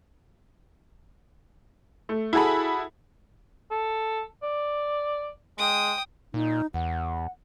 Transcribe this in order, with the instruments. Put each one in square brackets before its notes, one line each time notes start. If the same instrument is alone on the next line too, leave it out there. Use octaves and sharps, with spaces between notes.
[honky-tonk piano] A3
E4 F#4 G#4 A4 B5
[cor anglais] A4
D5
[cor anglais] G#3 [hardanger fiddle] G5 D#6
[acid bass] A#2 [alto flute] D#4
[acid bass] E2 [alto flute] F#5